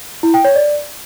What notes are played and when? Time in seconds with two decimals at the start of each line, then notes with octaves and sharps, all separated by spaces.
0.23 E4
0.34 G5
0.45 C#5
0.55 D5